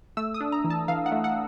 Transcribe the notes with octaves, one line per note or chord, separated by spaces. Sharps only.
A3 E6
D#6
D4
A#5
E3
A5
E3 F5
F#5
A3
F#5